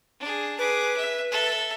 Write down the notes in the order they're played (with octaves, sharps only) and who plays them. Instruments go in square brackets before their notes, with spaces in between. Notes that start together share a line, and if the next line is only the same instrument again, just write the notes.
[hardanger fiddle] D4 G#4
[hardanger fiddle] G#4 D6 [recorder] B4
[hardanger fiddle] E5
A4 E5